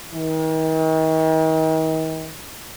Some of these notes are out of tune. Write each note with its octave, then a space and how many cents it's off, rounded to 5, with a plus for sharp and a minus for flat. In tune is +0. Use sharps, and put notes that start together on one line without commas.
D#3 +40